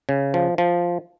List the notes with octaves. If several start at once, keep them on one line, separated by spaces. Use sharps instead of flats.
C#3
F3
F3